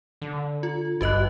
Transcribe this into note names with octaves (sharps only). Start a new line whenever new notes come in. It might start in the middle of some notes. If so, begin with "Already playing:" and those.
D3
F4
G#1 G2 F#4 B4 D#5 F#6